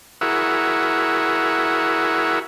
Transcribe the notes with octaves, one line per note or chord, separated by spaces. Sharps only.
E4 F#4 G#4 A#4 E5 F#5